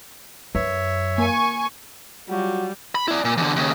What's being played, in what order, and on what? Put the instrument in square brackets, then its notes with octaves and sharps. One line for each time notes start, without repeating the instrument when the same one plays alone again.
[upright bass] F#2 [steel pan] B4 [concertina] C#5 E5
[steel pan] A#3 [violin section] G#5 C#6
[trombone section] F#3 F4 F#4 [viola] G3
[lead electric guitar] B5
E4 D5
A#2
E2 D3
D#2 C#3